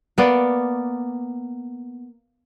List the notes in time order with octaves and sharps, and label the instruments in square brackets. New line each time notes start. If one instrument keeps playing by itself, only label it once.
[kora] A#3 B3 D5